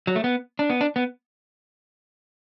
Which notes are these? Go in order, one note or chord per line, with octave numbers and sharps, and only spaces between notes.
F#3
A3
B3
D4
B3
D4
B3